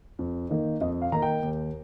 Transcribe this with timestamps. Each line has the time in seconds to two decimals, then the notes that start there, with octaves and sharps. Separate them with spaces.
0.19 F2
0.50 D#3 A#3 D#4
0.81 F2 D#5
1.02 F5
1.12 D#3 A#3 D#4 A#5
1.22 G5
1.43 D#2